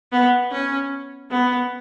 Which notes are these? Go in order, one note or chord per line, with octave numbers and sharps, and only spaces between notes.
B3
C#4
B3